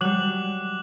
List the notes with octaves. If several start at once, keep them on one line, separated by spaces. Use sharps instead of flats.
F#3 G3 D6 F#6 F#7